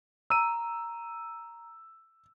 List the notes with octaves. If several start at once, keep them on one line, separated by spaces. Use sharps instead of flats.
A#5 E6 D#7